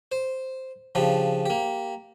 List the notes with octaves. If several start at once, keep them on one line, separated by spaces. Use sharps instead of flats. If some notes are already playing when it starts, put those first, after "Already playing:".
C5
C#3 F3 D4 G4
A#3 G4